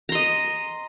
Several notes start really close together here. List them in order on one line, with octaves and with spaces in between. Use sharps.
A#5 C6 D#5